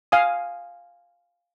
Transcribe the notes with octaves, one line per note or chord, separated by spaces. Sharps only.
F5 G#5 D#6